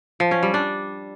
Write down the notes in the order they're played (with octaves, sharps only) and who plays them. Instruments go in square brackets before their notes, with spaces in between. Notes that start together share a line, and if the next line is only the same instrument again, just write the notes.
[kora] F3
C#4
G3
D4